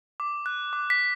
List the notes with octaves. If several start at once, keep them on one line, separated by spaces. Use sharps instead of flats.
D6
F#6
D6
B6